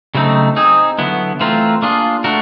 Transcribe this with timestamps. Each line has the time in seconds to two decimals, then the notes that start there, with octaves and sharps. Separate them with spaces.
0.15 C#3 F#3 A3 C4 D#4
0.56 C4 D#4 G#4
0.99 D3 F#3 B3 E4
1.40 E3 A3 C4 F4 A#4
1.82 A#3 D4 F4 G#4
2.24 A3 D4 F#4 A#4